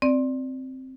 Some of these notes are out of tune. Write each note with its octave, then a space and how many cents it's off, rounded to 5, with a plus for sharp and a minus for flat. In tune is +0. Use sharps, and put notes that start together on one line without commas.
C4 +0 D5 +0